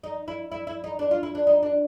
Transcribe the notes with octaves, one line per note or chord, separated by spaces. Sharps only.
D#4
E4
E4
E4
D#4
D4
F4
E4
D4
D#4
D4